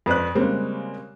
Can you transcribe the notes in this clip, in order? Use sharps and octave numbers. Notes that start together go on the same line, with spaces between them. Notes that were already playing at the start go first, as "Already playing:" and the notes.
F2 B4 C5 D5 F#6
C#3 G3 G#3 A#3 C4